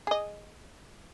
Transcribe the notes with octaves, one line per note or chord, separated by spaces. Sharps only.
G#4 D#5